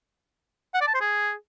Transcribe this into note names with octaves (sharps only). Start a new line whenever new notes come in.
F#5
D5
A5
C5
G#4